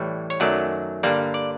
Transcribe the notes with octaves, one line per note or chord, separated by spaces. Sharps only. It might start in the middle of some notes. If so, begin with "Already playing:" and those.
Already playing: A2 E3 G3 C#5
C#5
F#2 D#3 F#3 A3 D5
G2 D3 G3 A#3 D5
D5